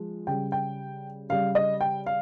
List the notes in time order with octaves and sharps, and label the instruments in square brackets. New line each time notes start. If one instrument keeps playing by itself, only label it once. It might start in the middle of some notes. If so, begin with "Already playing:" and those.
Already playing: [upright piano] F3 G#3
C#3 G3 G5
G5
C#3 G3 F5
D#5
G5
F5